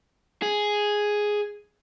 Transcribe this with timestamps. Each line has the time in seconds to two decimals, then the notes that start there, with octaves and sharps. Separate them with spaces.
0.42 G#4